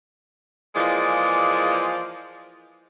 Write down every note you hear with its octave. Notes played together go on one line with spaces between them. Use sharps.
E3 F3 G#3 A#3 G#4 D5